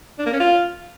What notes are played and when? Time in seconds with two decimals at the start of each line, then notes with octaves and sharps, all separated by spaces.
0.19 D4
0.26 A#3
0.33 C#4
0.40 F4